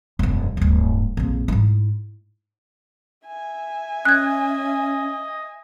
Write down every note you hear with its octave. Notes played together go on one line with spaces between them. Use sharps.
E1 F#2
D1 G2
A#1 F2
G#2 E4
E5 G#5
C#4 D#5 F#6 G#6